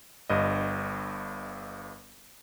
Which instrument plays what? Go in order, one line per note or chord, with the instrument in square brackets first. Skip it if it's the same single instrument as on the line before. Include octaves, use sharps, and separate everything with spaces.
[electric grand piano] G1 G2 D#5